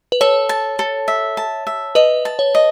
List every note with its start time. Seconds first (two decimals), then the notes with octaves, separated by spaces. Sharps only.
0.12 B4
0.21 A4 C#5
0.49 A5
0.79 A4
1.08 E5
1.37 A5
1.67 E5
1.95 B4 D#5
2.25 A5
2.39 C#5
2.55 D#5